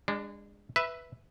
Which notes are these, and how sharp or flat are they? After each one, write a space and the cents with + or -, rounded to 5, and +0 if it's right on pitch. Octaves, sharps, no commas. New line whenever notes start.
G#3 -30 D4 +5
B4 +0 E5 +0